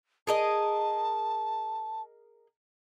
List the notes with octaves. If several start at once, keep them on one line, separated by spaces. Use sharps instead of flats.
G#4 A#4 D#5 A5